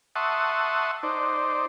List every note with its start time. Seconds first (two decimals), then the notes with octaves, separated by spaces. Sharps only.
0.16 E5 F#5 A5 C6 C#6 D#6
1.03 D#4 C5 D5